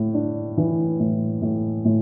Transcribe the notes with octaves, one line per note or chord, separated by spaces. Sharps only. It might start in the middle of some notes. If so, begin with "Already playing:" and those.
Already playing: A2
D4
E3
A2
A2
A2